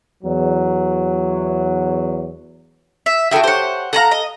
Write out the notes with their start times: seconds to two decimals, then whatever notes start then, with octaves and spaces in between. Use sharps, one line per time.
0.24 E2 F#3
3.06 E5
3.31 F#4 G#4 A4 E5 G5
3.44 G4 C5 C#5 F#5
3.93 A4 F5 F#5 G#5 A#5
4.11 D#5